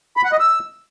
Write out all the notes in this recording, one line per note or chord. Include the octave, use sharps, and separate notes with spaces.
B5
F#5
D#5
E6